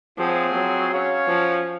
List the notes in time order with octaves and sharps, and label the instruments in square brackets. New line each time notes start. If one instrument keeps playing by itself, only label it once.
[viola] F3 [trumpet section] C4 F4 G#4 C#5 F#5
[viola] F#3
[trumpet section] C#4 F#4 C#5 F5
[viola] F3